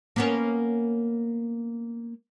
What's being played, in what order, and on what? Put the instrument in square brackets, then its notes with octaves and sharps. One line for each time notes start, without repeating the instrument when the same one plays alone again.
[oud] A#3 B3 C#4